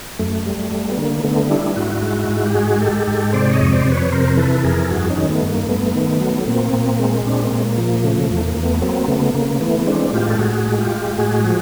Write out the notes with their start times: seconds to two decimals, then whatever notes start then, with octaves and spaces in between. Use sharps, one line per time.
0.19 F#2 A3
0.46 G3
0.72 G3
0.92 B3
0.97 D3 A#3
1.24 D3 A3 B3
1.50 G3 D4 E4
1.76 G#2 E4 F#4
2.02 G#3
2.29 G#2
2.44 G4
2.54 G#3 F#4 G#4
2.80 G#3 G4 A4
3.07 G#2 G4 A4
3.33 C3 C5 D5
3.53 C#5 D#5
3.60 F2
3.73 C5 D5
3.85 F2
3.92 B4 C#5
4.12 C3 A#4 C5
4.37 E3 A4 B4
4.55 A4
4.63 F2 G#4 A#4
4.84 A4
4.90 G2 F#4 G#4
5.10 C#4 D#4
5.17 D#3
5.29 A3 B3
5.42 G2
5.49 A#3
5.68 G2 A3 B3
5.95 D#3
6.20 F#3
6.47 A#2 A#3 C4
6.73 A#2
6.99 G#3
7.25 A#2 C4 D4
7.45 A#3 C4
7.52 A#2
7.65 A#3
7.78 F3
7.84 A#3
8.04 C#3 A3
8.24 A3
8.30 E2
8.43 A#3
8.54 E2 A#3
8.62 A3 B3
8.82 F#3 A#3 C4
9.08 C#3 A3 B3
9.34 C#3 A#3
9.61 E3 A3 B3
9.86 G#3 C4 D4
10.13 A2 F4 G4
10.28 A4
10.39 A2 F#4 G#4
10.66 G#3
10.78 F4 G4
10.92 G#3
11.18 A2 F#4 G#4
11.44 F3